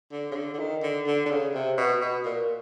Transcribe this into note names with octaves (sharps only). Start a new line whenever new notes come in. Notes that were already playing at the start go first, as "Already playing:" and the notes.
D3
C#3
D3
D3
D#3
D3
D3
D3
C#3
C3
B2
B2
A#2